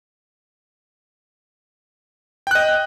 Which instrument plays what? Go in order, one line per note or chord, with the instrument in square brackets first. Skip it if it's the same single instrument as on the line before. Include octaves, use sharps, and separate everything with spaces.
[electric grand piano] G5
F#6
D#5